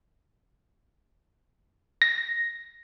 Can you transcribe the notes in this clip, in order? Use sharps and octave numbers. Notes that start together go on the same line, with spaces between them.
A#6